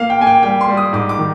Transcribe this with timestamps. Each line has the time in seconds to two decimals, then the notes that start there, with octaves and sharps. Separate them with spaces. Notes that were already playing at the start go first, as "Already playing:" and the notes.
Already playing: A#3 F5
0.10 G5
0.19 A#3 G#5
0.27 G5
0.43 G3 G5
0.61 C6
0.68 G3
0.77 D#6
0.93 G#2 D6
1.09 D6
1.18 D#3